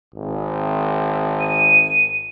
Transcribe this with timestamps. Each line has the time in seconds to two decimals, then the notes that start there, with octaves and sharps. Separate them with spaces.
0.14 G#1
1.40 D#7